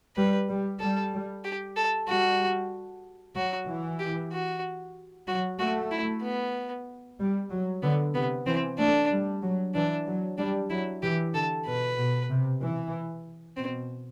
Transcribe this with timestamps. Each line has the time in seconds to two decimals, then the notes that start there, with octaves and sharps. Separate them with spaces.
0.16 G3 B4
0.48 G3
0.80 G3 A4
1.44 G4
1.77 A4
2.08 G3 F#4
3.35 F#3 F#4
3.68 E3
3.99 G4
4.32 F#4
5.27 F#3 F#4
5.59 A3 F#4
5.91 E4
6.22 B3
7.19 G3
7.50 F#3
7.82 D3 B3
8.14 C3 B3
8.46 E3 C4
8.78 A3 D4
9.11 G3
9.42 F#3
9.74 E3 D4
10.07 F#3
10.38 G3 D4
10.70 F#3 E4
11.02 E3 G4
11.34 D3 A4
11.66 B2 B4
11.97 B2
12.30 C3
12.62 E3
13.57 B2 C4